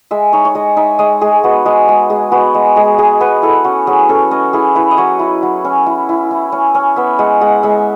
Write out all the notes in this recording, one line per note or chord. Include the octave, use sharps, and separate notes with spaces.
G#3 E5
D#4 C#5
C#5
G#3 D#5
D#4 E5
G#3 D#5
G#3 G#4
B3 F#4
G#3 G#4
G#3
G#3 G#4
B3 F#4
G#3
G#3 G#4
G#3 G#4
B3 B4
E4 A4
C#4 F#4
F#3 G#4
C#4 A4
C#4 D#5
E4 G#4
E4 B4
D#5
F#3 C#5
E4
F#3
C#4
E4
E4
E4
C#4
C#4
B3 E5
G#3 F#5
G#3 F#5
G#3 E5